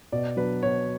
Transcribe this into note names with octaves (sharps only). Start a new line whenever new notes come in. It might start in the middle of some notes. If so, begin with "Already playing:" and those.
B2 D5
F#3 B3 D4 B4
B2 C#5